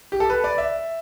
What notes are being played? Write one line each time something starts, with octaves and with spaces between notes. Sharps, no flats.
G4
A4
B4
D5
E5